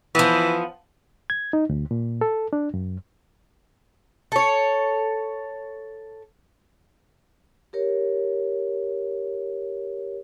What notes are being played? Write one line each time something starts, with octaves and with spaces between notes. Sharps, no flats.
E3 F3 B3
G#6
D#4
D2
A#2
A4
D4
F#2
A4 C#5
G4 A#4 C#5